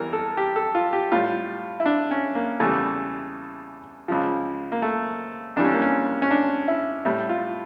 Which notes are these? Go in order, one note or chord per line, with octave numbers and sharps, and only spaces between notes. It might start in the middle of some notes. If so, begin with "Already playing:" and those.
Already playing: E2 E3 G3 A#4
A4
G4
A4
F4
G4
A2 G3 F4
E4
D4
C#4
A#3
E2 C#3 E3 G3 A3
C#2 C#3 F3
A#3
A3
F2 E3 G3 D4
C#4
A#3
C#4
C#4
D4
E4
A2 G3 E4
F4